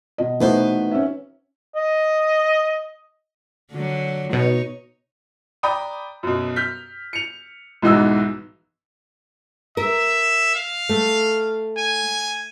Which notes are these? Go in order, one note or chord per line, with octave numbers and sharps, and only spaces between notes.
B2 D#5
C3 E3 A3 B3 D#4 F#4 B4 C5
C#4 E5
D#5
D3 F#3
B2 D#4 C#5
D5 G5 A#5 B5 D#6
F#2 B2
F6 G6 B6
C#7 F7
B1 G#2 E3 D#4 F#4 E6
A#4 E5
F5
A3
G#5